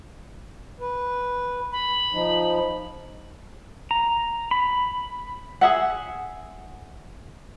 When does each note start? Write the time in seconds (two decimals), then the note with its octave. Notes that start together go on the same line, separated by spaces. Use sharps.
0.80 B4
1.72 B5
2.13 F3 D#4
3.91 A#5
4.51 B5
5.61 G#4 E5 F#5